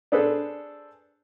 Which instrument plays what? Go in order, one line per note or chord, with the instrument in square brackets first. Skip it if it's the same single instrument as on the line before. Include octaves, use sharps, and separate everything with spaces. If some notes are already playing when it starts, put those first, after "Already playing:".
[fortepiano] D4 G#4 A4 B4 C5